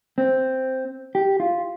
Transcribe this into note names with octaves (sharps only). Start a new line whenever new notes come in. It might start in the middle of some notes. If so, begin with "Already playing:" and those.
C4
G4
F4